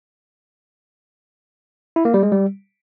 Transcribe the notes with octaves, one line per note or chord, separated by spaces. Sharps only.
E4
A#3
G3
G#3
G3